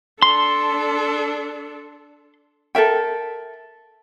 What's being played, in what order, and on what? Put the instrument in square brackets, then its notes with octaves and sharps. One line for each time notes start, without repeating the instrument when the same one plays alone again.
[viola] D4 A4 [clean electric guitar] C6
[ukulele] A4 A#4 E5 G5